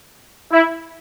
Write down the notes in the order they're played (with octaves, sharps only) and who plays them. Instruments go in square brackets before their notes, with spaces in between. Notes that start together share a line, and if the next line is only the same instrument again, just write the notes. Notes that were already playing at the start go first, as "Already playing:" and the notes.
[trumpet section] E4